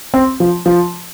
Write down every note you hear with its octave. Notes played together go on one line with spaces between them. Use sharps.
C4
F3
F3